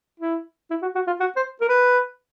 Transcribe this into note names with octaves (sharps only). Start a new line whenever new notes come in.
E4
E4
F#4
F#4
F4
F#4
C5
A#4
B4